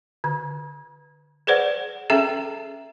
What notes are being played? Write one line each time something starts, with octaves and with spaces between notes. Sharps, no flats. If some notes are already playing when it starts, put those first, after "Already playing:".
D3
G#4 B4 C5 D5 F#5
C#4 G#4 A4 E5 G5 A#5